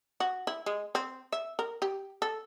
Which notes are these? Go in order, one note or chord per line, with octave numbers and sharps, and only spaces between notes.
F#4
E4
G#3
C4
E5
A#4
G4
A4